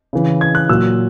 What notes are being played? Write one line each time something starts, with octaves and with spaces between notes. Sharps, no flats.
C#3 E3
G#6
F#6
A#2 F#3 E6